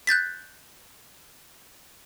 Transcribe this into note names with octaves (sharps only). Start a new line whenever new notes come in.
F#6 G6 A6 B6